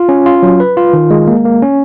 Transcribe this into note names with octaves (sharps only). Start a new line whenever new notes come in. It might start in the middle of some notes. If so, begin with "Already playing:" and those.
Already playing: F4
C#4
F4
F#3
B4
F4
D#3
G#3
A#3
A#3
C#4